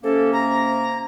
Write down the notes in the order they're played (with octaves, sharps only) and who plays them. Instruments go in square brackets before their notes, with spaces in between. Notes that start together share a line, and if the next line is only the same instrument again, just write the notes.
[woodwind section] C3 A#3 C#4 [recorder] A4
[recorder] A#5